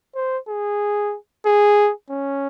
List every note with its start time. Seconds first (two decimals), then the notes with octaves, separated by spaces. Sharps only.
0.15 C5
0.48 G#4
1.46 G#4
2.10 C#4